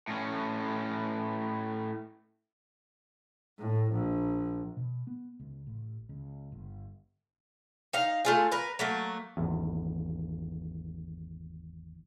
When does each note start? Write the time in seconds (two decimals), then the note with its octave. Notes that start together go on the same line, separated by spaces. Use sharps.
0.08 A2 C#4
3.59 A2
3.93 A#1
4.77 B2
5.07 B3
5.40 C#2
5.67 A1
6.09 C#2
6.52 G1
7.93 D#4 F5
8.25 A3 F4 G#4
8.52 A#4 B4
8.79 F#3 A3 A#3
9.37 G#1 E2